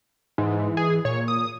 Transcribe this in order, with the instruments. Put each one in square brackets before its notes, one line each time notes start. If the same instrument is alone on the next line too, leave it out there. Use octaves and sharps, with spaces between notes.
[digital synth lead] G#2 [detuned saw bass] E3
[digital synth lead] G#4
[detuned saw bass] A#2 [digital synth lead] C#5
[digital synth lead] D#6